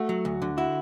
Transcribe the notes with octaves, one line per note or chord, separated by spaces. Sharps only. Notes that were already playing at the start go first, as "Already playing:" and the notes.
Already playing: A3 F#4
F#3
D2
D3
E4 F#4